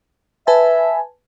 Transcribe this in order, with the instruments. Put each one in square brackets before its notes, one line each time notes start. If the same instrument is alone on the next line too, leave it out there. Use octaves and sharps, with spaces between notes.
[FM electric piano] B4 G#5 A5 [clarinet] E5